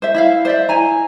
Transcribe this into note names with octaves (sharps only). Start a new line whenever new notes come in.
C5 E5
E4 E5 F5
C5 D5 E5
E4 G#5 A#5